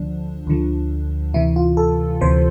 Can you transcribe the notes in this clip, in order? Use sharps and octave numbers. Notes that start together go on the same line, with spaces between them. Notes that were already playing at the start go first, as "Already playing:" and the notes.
Already playing: D2 D3 F3 D4
D2 D3 F3
D2 C3 E3 E4
F4
A4
D2 C3 E3 C5